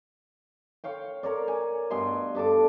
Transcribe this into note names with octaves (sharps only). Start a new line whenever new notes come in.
C#5 F5 G5
A#4 C#5 D5
G#5
G2 B2 G#5 C6
G2 D4 A4 D6